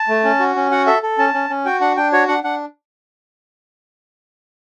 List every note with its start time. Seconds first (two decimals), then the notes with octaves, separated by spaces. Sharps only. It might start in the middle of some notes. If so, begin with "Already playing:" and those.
Already playing: A5
0.08 A3
0.24 C#4
0.40 F#4
0.56 C#4
0.71 F#4 F#5
0.87 A4 E5
1.03 A4
1.18 C#4 A5
1.34 C#4
1.50 C#4
1.65 F#4 G5
1.81 D4 F#5
1.97 D4 G5
2.13 F#4 C#5
2.28 D4 F#5
2.44 D4 F#5